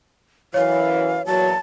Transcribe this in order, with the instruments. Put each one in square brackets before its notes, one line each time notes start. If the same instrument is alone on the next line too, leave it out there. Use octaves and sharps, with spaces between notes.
[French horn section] F#2 E3 [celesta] C#5 [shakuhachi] F5
[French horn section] E2 A#2 F#3 [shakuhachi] A5